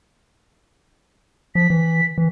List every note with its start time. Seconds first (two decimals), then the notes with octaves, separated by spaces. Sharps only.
1.55 F3 B6
1.70 E3
2.18 E3